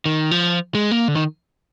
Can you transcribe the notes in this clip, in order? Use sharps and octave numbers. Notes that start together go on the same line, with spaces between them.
D#3
F3
G#3
A#3
D3
D#3